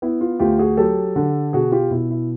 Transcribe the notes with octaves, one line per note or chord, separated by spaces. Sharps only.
B3 E4
F4
D2 F4 G4
F#4 G#4
F#3 G4 A4
D3
B2 F#4 G#4
F4 G4
B2 E4
E4